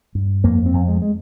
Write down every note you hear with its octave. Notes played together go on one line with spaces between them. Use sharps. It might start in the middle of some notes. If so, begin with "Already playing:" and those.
G2
F2 A#3
C4
F2
G#3
G#3